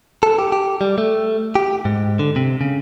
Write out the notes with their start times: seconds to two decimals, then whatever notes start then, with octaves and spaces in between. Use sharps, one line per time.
0.23 A4
0.39 G4
0.52 G4
0.81 G3
0.98 A3
1.55 G4
1.85 G#2
2.19 D3
2.36 C3
2.61 C#3